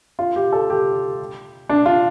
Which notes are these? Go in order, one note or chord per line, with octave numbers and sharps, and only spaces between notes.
F4
G4
A4
G4
D4
F4